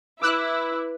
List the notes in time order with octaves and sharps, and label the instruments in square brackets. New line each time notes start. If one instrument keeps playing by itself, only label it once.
[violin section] E4 [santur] B4 [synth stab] D6 E6 F#6